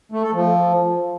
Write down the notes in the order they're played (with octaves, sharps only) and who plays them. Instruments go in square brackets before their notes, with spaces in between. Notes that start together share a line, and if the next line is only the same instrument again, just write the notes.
[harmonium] A3
A4
F3